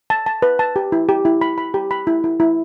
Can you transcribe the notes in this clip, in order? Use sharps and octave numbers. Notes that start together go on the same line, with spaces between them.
A5
A5
B4
A5
G4
E4
G4
E4
B5
B5
G4
B5
E4
E4
E4